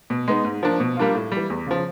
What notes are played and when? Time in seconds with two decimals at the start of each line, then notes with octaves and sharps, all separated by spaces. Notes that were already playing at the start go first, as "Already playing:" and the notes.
0.10 B2
0.28 G#3 B3 D#4
0.45 G#2
0.63 F3 A#3 D4
0.80 B2
0.97 G3 A#3 D4 F4
1.15 A2
1.32 G3
1.37 E3
1.50 E2
1.67 C#3 F3